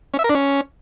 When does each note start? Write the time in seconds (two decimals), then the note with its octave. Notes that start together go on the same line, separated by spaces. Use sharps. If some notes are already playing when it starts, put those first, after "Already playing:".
0.14 C#4
0.19 E5
0.24 A#4
0.30 D4
0.35 C#4